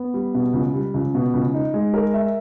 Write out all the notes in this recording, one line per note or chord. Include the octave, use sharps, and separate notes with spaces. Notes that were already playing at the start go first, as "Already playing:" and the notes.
Already playing: B3
G3
B2
C#2
G3
C#2
B2
C#2
D#4
G#3
A#4
E5